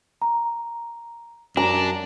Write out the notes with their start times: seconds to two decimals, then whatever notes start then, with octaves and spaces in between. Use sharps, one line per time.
0.22 A#5
1.57 F#2 D4 A#5